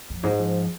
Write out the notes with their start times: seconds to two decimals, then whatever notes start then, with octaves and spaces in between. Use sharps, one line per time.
0.10 F2
0.23 G#2 F3
0.31 G#3
0.39 F3